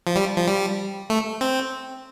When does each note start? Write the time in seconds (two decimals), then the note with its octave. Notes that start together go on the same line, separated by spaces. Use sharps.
0.07 F3
0.16 G3
0.37 F3
0.47 G3
1.10 A3
1.41 C4